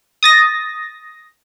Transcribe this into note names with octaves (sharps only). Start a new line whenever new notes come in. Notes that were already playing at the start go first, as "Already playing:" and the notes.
D#6 A6 A#6